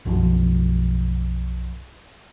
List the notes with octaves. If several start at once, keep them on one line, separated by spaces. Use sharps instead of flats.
B1 F#2 B2 F3